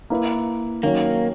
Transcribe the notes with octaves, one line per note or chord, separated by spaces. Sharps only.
A#3 E4 B4
D#3 F#3 A#3 C#4 F#4